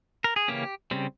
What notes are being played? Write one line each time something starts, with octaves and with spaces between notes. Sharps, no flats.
A#4
G#4
C#3 E3 A#3 C#4 G4
C#3 G3 C4